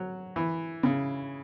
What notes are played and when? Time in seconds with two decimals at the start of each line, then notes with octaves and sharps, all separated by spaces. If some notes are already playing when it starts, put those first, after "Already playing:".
Already playing: F#3
0.36 E3
0.83 C#3